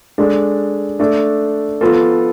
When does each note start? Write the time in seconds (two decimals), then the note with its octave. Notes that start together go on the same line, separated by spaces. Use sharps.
0.18 G#3 D4 A4
0.99 A3 D4 A4
1.81 F3 B3 F4 A4